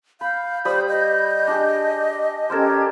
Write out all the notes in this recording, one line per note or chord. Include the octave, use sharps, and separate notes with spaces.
F5 B5 G6
G3 C5 B5 D#6
D#5
D4 G4 G#4
C#4 G4 A4 A#4 C5 G#6